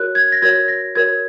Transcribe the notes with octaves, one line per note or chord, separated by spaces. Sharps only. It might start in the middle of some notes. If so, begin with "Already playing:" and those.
Already playing: F#4 A#4 C#5 F#6
G#6
A#6
F#4 A#4 C#5 G#6
A#6
F#4 A#4 C#5 G#6